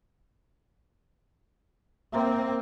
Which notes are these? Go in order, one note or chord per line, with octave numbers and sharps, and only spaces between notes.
A#3 C4 E5 A#5 C6